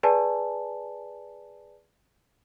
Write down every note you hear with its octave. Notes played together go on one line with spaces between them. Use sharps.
G#4 B4 D5 G#5 A5